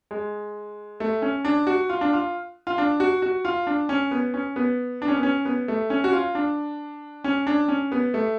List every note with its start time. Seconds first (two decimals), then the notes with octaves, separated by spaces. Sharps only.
0.11 G#3
1.00 A3
1.22 C#4
1.45 D4
1.67 F#4
1.89 F4
2.01 D4
2.13 F4
2.67 F4
2.78 D4
3.00 F#4
3.22 F#4
3.45 F4
3.67 D4
3.89 C#4
4.11 B3
4.34 C#4
4.56 B3
5.02 D4
5.08 C#4
5.16 B3
5.23 C#4
5.45 B3
5.68 A3
5.90 C#4
6.04 F#4
6.13 F4
6.35 D4
7.24 C#4
7.47 D4
7.68 C#4
7.92 B3
8.14 A3